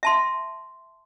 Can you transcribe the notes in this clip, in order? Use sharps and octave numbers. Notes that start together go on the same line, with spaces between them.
E5 A5 C6